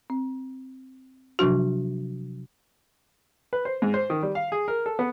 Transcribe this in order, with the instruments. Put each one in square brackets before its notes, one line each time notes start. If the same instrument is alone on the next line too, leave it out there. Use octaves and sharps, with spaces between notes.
[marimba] C4
C3 F3 F#3 D4 F#4
[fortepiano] B4
C5
G#2
C5
D#3
G3
F5
G#4
A#4
A4
B3